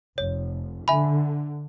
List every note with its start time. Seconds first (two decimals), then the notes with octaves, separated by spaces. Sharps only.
0.18 F1 C#5
0.88 D3 E5 G#5 B5